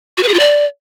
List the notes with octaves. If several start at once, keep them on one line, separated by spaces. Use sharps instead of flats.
F#4
B4
G#4
F4
D5